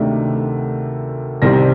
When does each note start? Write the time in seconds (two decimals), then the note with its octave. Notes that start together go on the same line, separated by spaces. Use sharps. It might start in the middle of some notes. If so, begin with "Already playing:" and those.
Already playing: D2 C3 D#3 A3 D4
1.42 C2 C3 D#3 G3 C4 A#6